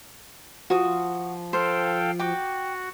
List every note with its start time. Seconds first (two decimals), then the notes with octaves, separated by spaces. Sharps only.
0.70 F3 F#4 D#6
1.53 A4 C5 F5 G5
2.19 F#4 G5 D6